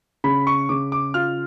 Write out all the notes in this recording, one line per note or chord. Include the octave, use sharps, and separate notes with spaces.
C#3 B5
C#6
C#3 D6
D6
F4 F6